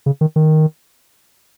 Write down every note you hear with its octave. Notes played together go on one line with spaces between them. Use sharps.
C#3
D#3
D#3